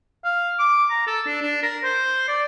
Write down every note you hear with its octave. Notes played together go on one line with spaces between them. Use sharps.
F5
D6
A#5
A4
D4
D4
A#4
C5
D5